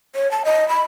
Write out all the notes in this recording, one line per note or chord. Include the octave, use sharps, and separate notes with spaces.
C#5
A5
D#5
B5